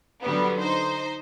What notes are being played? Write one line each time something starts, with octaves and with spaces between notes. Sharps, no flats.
D3 F#3 G3 B3
D#4 C5